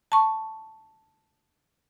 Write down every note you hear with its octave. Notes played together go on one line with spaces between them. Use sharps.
A5 C#6